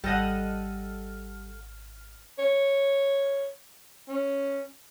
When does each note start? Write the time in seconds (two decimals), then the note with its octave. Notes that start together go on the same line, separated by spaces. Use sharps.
0.04 G#1 G3 A4 D#5 F#5 F6
2.38 C#5
4.08 C#4